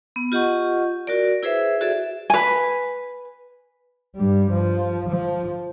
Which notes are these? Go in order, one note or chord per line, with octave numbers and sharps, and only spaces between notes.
B3
F4 G4 D#5 F#5 C#6
F#4 A#4 D5
E4 G#4 B4 C5 E5
F#4 G#4 A4 D5 E5
B4 G#5
G2 G3
F3
F3